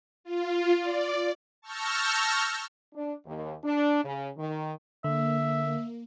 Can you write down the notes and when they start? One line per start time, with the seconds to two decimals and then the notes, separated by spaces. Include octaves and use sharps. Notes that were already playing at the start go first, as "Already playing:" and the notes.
0.24 F4
0.79 D5
1.62 A5 C#6 E6 F6 G6 A#6
2.94 D4
3.26 D#2
3.63 D4
4.04 C#3
4.37 D#3
5.04 D3 A#3 E5